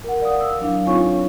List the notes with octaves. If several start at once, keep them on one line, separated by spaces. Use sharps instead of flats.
A#4 F#5
D5 F5 D#6
E6
F#3 D4 E4 F5
C4 D#4 F4 C#5 G#5 C#6